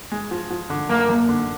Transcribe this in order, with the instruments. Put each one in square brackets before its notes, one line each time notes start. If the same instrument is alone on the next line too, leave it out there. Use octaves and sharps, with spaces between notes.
[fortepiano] G#3
F3
F3
D3
[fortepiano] F#2 [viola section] A#3
[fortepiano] F#2
D3